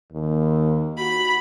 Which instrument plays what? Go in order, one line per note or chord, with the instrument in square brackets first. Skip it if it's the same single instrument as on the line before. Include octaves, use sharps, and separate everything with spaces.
[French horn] D#2
[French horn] F#4 [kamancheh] B5